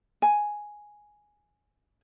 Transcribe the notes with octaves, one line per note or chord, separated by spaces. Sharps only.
G#5